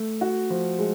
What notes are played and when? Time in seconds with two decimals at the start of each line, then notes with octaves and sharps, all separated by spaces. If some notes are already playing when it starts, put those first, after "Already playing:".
Already playing: A3
0.21 F#4
0.50 F3
0.79 G#3